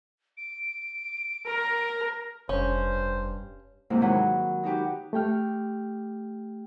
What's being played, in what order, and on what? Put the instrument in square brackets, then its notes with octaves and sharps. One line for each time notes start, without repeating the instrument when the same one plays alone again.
[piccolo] D7
[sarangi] A#4
[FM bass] F1 [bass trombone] G2 [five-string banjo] C#4 [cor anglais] C5
[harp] G#2 C3 E3 A#3 E4
D#3 F#3 B4 F#5
D#4 F#4 G4 B4
[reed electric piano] A3 G4 G5 F6